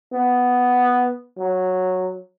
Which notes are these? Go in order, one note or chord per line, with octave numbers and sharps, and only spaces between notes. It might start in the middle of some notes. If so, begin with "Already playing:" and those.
B3
F#3